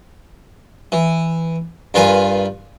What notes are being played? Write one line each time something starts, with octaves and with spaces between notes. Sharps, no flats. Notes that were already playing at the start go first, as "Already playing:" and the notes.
E3
G2 F4 A#4 B4 G#5